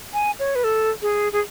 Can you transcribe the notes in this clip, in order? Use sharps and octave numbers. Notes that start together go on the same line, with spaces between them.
G#5
C#5
B4
A4
G#4
G#4